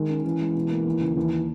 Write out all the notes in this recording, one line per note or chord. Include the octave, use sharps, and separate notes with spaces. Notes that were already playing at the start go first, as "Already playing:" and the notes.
Already playing: D#3 G#3
C#4
E3 C#4
G#3
B2
A#3
D#2
C#3
D#2 E3